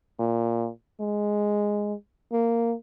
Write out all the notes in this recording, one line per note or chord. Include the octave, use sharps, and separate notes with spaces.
A#2
G#3
A#3